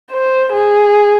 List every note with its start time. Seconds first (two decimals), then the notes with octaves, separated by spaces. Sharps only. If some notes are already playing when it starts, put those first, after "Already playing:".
0.12 C5
0.53 G#4